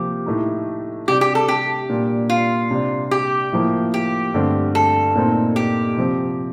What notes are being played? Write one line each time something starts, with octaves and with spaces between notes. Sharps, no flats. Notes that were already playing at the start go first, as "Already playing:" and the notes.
Already playing: C3 F3 A#3 G4
A2 A3 D#4
C3 G3 D4 G4
G4
A4
G4
A#2 G3 D4
F4
C3 G3 D4
G4
A2 F3 A#3
G4
G2 D3 A3 C4
A4
A#2 A3 C4 D#4
G4
C3 F3 C4